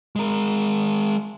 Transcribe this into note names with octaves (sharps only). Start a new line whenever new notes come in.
G#3 A#4